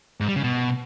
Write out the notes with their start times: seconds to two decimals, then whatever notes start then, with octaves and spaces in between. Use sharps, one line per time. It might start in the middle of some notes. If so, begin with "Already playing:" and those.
0.20 G#2
0.28 G3
0.36 C#3
0.44 B2